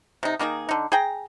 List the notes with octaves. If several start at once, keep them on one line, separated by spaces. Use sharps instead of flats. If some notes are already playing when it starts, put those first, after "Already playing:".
C3 D#4
D#3 A#3 D#4 G#4
D3 D#4
G#4 G5 A#5